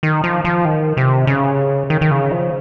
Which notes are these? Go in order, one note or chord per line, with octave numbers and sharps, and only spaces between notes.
D#3
F3
F3
D#3
C3
C#3
D#3
D#3
C#3
F3